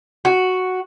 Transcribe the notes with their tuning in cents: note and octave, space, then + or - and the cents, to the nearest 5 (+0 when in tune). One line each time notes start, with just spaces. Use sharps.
F#4 +0